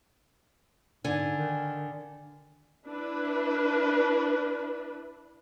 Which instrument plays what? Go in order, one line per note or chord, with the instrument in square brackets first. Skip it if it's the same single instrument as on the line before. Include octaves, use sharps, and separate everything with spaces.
[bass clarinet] G#2 [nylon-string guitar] D3 [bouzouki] G#5
[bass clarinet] D#3
[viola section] D4 E4 B4